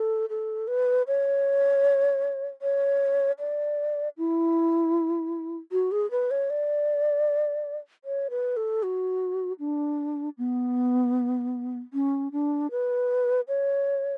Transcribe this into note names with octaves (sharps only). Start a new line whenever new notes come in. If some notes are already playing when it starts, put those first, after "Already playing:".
Already playing: A4
A4
B4
C#5
C#5
D5
E4
F#4
G#4
B4
C#5
D5
C#5
B4
A4
F#4
D4
B3
C#4
D4
B4
C#5